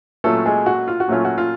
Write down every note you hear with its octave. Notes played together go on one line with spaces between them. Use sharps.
A#2 F#3 A3 C#4 F4 A4
G#3 G#4
F#4
F4
F#4
A#2 F#3 A3 C#4 F4
F#4
F4